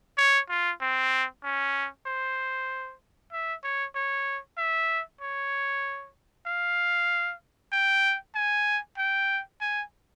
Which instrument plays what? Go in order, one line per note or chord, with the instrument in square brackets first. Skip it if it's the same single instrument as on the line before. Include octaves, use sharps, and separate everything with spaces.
[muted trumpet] C#5
F4
C4
C#4
C5
E5
C#5
C#5
E5
C#5
F5
G5
G#5
G5
G#5